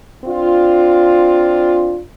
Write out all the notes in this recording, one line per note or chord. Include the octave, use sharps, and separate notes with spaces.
C4 D4 F4